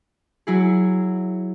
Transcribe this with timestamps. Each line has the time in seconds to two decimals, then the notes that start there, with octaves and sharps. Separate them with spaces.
0.47 F#3 E4 G#4